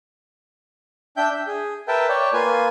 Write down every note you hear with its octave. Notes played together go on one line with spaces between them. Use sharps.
D4 E5 G5 G6
E5
G#4
A#4 B4 E5 G5 A5
C#5 D5 G5
A#3 F4 B4 G#5